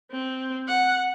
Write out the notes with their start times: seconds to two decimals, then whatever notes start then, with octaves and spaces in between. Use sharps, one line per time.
0.11 C4
0.68 F#5